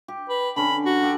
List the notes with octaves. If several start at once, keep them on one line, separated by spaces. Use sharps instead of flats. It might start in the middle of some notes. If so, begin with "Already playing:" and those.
G4
B4
D3 C#4 B5
F#4
G4 A4 G5